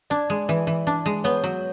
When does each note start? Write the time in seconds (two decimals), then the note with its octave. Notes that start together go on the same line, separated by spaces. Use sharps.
0.10 D4 D5
0.30 G#3
0.49 E3
0.67 E3
0.87 D4
1.06 G#3
1.24 B3 C#5
1.44 F#3